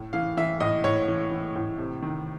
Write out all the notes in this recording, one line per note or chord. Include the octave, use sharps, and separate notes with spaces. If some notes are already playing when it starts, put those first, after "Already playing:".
Already playing: A2
E3 F5
E3 E5
A2 D#5
A2 C#5
E3
E3
A2
C3
D#3